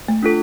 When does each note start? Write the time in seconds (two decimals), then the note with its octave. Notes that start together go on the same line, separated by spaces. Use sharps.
0.08 A3
0.23 D4 F4 A4